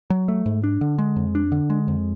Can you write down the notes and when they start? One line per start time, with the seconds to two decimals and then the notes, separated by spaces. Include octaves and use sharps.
0.10 F#3
0.28 A3
0.46 G#2
0.64 D4
0.81 D3
0.98 G#3
1.16 F2
1.35 D4
1.52 D3
1.70 G#3
1.88 F2